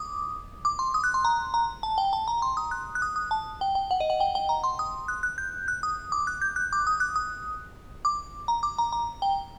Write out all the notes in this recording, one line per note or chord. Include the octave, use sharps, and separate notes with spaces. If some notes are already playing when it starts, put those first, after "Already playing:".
Already playing: D6 D#6
D6
C6
D#6
F#6
C6
A#5
A#5
A5
G5
A5
A#5
C6
D#6
F#6
F#6
D#6
D#6
A5
G5
G5
F#5
D#5
F#5
G5
G5
A#5
C6
D#6
F#6
F#6
G6
F#6
D#6
D6
F#6
G6
F#6
D6
D#6
F#6
D#6
D6
A#5
D6
A#5
A#5
G5